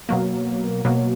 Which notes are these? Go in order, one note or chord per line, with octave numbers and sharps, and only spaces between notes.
B2 F#3 A#3
B2 F#3 A#3